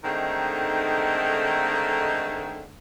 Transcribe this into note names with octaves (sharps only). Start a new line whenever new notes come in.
D3 D#3 G#3 A3 C4 D#4